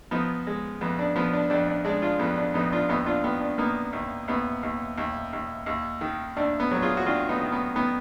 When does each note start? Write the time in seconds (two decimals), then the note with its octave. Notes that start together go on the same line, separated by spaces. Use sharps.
0.11 F3 B3 D#4
0.47 G#3
0.81 F2 B3
0.99 D4
1.16 F3 B3
1.33 D4
1.50 F2 D4
1.67 D4
1.85 G#3 D4
2.02 D4 F4
2.19 F2 B3
2.37 D4
2.54 F2 B3 D#4
2.72 D4 F4
2.89 D#2 B3 D#4
3.06 D4 F4
3.24 D#3 B3
3.41 D4
3.58 A#3 B3 D#4
3.93 D#2
4.28 D#2 B3
4.63 D#2
4.98 D#2
5.33 D#2
5.66 D#2
6.01 D#3
6.37 D#2 D4
6.60 B3
6.72 F#3
6.82 F4 G#4
6.97 F#4
7.06 D#3 D4 F4
7.29 B3 D#4
7.41 D#3
7.52 B3
7.75 D#3 B3